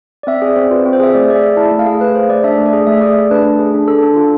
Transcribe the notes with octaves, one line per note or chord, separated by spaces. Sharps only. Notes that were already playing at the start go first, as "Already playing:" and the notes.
D5
C4 E5
G#4 D5
C4 C5
F4 B4
C4
C5
G#4 E5
A3 D5
G#4 D5
E5
A3
E4 A5
A3
F5
G#4
A3 B4
G#4 C5
A3 D5
D4 E5
A3
D5
G#4
A3 E5
G#4 D5
A3
D4 B4
A3
G#4
D4
A4
D4
F4